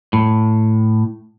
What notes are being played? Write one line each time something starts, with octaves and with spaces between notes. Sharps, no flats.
A2